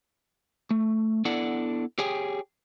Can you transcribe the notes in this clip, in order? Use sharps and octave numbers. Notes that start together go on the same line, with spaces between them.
A3
B3 D4 E4 A4 D5 F#5
G4 G#4 C#5 G5 G#5